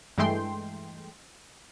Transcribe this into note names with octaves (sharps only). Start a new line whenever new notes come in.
G2 E3 G#3 A3 G5 C6